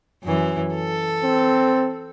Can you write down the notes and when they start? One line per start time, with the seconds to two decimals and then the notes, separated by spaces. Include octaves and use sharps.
0.23 F#2 E3
0.74 A4
1.24 C4